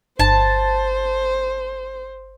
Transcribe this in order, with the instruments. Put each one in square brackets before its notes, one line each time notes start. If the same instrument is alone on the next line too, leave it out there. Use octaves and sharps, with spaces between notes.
[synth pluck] G1 [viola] C5 [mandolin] A5